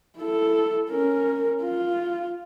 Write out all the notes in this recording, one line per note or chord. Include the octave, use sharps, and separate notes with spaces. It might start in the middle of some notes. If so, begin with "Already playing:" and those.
E4 A4
C#4 A#4
F4